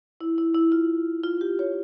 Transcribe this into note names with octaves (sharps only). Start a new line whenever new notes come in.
E4
E4
E4
F4
F4
G4
C#5